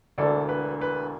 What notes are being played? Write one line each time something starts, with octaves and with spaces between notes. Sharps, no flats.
E1 D2 D3 A4 D5
B4
B4